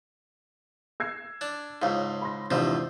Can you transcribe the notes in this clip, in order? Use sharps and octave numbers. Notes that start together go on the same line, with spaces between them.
E6 G#6 C7
D4
C#2 G#2 C#5 F5
B5 C6 A#6
E2 G#2 C3 F3 C4 D4